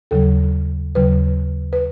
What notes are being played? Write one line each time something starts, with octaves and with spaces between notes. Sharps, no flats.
D#2 C#3 F#3 A4
D#2 C#3 F#3 B4
B4